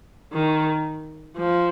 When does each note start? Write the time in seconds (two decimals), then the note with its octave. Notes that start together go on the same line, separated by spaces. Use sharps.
0.32 D#3
1.37 F3